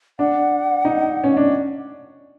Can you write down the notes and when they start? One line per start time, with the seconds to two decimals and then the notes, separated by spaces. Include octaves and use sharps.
0.19 D4 F#5
0.85 D#4
1.24 C#4
1.37 D4